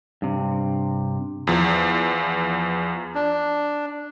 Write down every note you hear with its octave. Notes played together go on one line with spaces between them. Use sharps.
G2 C3
E2 F3
D4